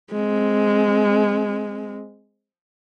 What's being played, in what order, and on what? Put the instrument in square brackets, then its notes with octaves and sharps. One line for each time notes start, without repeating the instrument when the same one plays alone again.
[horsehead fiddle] G#3 C4